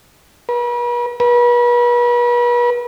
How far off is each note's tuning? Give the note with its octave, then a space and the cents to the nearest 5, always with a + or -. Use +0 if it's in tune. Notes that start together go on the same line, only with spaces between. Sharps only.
B4 -45
B4 -40